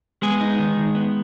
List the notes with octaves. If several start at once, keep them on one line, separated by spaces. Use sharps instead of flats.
G#3 B3 G#4
D#4
D#3
D#3
B3